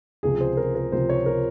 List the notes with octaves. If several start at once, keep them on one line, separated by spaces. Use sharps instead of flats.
C#2 C3 F3 G#4
C5
A#4
A#4
C#2 C3 F3 C5
C#5
A#4